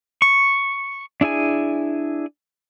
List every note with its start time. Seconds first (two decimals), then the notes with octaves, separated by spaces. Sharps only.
0.22 C#6
1.21 D4 E4 G#4 G#5